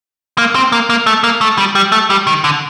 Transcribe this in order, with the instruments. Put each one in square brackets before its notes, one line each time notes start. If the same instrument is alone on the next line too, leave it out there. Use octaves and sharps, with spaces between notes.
[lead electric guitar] A#3
C4
A#3
A#3
A3
A#3
A3
G3
G3
A3
G3
D#3
D3